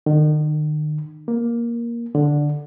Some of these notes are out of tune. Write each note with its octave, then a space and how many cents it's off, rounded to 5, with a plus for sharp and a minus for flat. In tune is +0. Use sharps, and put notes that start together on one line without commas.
D#3 -40
A#3 +10
D3 +0